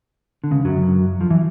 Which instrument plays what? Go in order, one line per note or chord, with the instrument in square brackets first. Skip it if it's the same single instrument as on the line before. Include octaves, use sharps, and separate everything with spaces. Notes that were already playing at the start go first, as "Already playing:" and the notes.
[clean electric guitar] D3
C#2 C#3
F#2 F#3
F2 F3
E3